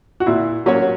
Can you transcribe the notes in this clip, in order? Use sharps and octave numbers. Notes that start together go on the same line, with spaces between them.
F#4
A#2 E4
F#3 A#3 C#4 F#4 C#5